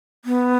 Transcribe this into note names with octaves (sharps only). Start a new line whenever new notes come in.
B3